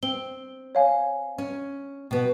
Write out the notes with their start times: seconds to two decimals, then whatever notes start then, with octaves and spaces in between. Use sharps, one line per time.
0.03 C4 G7
0.75 C#5 F5 G#5
1.38 C#4
2.11 B2 B3